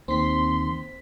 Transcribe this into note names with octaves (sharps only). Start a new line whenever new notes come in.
D#2 D#3 C4 C6 B6